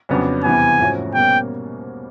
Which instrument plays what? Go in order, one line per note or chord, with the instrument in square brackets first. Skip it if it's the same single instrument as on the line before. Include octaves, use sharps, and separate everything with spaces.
[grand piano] F2 C#3 F#3 B3 D4
[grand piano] E2 C3 E3 G3 B3 [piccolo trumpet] G#5
[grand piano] G#2 F3 A3 C#4 F#4
[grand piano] B2 G3 A#3 C#4 [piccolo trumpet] G5